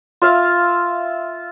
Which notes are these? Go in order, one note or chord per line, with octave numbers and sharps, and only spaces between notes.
F4 E5 F5